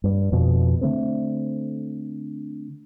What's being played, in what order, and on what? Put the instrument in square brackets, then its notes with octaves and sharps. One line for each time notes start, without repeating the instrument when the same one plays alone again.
[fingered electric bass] G2
F2 B2
D3 A3 C4